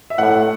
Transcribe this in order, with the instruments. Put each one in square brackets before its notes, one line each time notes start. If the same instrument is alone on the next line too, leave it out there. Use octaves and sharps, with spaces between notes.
[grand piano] E5
[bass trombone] A2 [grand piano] F#5